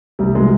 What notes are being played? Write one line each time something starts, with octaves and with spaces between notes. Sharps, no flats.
C2 G3
B2 G#3